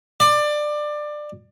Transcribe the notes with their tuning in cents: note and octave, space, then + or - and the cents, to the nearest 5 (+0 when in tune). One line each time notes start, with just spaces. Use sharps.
D5 +20